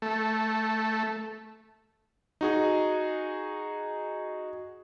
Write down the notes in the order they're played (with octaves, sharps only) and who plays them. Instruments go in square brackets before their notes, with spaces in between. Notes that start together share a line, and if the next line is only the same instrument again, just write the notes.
[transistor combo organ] A3
[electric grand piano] D#4 F#4 G#4